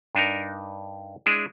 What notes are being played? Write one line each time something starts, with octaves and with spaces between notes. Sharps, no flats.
G2 D4 D#4 A#4
G#3 D4 E4 G#4